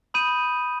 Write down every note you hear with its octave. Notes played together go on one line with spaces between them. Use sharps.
B5 D#6 G6 D#7